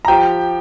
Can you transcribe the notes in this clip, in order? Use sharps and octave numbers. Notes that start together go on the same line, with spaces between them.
A#5
F3 G4 G5